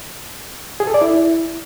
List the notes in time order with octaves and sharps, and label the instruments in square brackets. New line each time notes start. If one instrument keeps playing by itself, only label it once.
[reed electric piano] G#4
A4
D5
E4